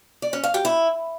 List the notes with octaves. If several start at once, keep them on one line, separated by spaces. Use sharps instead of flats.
D5
C#4
F5
G4
E4